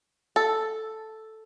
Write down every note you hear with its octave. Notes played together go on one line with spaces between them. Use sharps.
A4